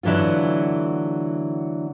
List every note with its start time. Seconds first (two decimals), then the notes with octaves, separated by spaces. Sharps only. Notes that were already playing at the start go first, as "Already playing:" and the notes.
0.03 D3 E3 F#3 A3 F4